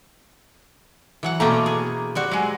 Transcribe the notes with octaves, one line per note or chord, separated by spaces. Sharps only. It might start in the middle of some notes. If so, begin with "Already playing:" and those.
E3 F#3 F#5
B2 A3 A#3 C4 C#4 A#5
G#4
G3 C4 F#4
F#3 G#3